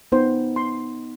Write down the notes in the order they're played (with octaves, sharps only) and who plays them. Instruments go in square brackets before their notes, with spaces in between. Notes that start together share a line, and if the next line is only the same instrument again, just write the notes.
[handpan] B3 D#4 [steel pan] C5
[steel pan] C6